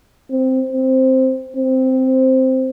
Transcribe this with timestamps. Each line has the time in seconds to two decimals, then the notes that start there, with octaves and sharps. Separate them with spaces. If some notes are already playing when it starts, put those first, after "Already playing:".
0.31 C4
0.73 C4
1.56 C4